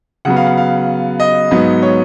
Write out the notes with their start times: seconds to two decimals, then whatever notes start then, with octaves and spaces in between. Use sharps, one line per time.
0.25 C#3 F#3 B3 F#5
0.36 F5
0.47 F#5
0.57 F5
1.20 D#5
1.51 G#2 F#3 B3
1.82 C#5